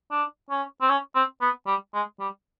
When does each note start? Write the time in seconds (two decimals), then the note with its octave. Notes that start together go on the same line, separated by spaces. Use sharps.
0.11 D4
0.50 C#4
0.81 C4
0.89 C#4
1.15 C4
1.41 B3
1.67 G3
1.94 G#3
2.20 G3